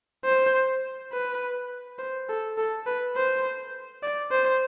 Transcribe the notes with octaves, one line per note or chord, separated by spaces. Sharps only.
C5
B4
C5
A4
A4
B4
C5
D5
C5